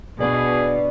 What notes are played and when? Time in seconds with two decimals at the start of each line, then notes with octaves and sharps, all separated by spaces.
0.20 B2 D4 G#4 B4 D5